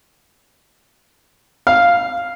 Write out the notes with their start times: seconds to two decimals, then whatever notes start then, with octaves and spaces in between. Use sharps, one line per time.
1.67 F5